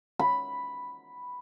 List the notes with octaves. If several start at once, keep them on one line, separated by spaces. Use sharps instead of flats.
B5